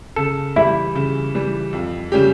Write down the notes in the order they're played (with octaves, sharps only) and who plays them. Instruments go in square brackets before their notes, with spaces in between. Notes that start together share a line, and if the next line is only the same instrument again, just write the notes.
[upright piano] C#3 [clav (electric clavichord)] A4
[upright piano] E3 G3 [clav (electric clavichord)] E4
[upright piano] C#3
E3 G3
F2
C#3 G3 C#4 G4